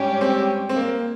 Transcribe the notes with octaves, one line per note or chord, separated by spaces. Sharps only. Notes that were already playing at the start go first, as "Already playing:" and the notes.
Already playing: G#2 G3 C#4 G4
C4
C4
A#3